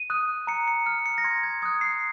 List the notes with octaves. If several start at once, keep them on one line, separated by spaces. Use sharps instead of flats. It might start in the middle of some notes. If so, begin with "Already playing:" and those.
Already playing: D#7
D#6 F#6
A#5 C#7
C#7
F6 C#7
C#7
A#6
C6 G#6
G#6
D#6 F#6 G#6
C7